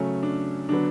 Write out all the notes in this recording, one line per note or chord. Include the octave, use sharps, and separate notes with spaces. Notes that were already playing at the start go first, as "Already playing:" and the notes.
Already playing: C#3 F#3 A3 C#4
D4
D3 F#3 B3 D4